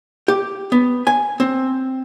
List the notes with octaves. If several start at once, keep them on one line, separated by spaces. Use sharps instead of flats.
G4
B3
G#5
C4